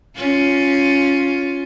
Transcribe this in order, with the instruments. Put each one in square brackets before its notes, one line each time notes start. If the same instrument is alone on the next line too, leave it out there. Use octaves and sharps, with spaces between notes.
[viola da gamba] C#4 F4